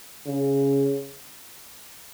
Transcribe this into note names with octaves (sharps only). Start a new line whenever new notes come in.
C#3